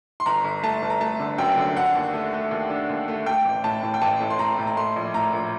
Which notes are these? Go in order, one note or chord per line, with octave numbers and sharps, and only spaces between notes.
C6
G1 A#5
G1
A3 A5
G1
A#5
A3 A5
D3
F#2 G5
D3
D4 F#5
D#2
A3
A3
D#2
D4
D#2
A3
A3 G5
A1
A2 A5
A2
G5
A1 A5
A2
C6
A2 A#5
A2
A#5
A3 C6
A#1
A2 A#5
A#1